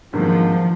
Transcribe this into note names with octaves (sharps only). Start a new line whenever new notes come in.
G#1 G2 D#3 F3 A#3